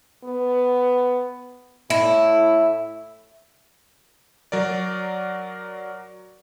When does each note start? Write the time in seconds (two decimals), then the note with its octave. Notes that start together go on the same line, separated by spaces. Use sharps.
0.24 B3
1.90 A2 E4
4.52 F#3 A#4 D5